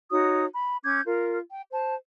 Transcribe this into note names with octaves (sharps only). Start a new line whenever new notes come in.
D#4 F#4 C#5 D#6
B5
C#4 D6 G6 G#6
F4 A#4
G5
C5 A5